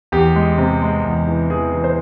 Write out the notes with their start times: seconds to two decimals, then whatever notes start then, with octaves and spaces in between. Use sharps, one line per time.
0.12 E2 G4
0.35 G#3
0.58 C3
0.82 G#3
1.04 E2
1.27 E3
1.50 E3 G#4
1.73 E3
1.84 C5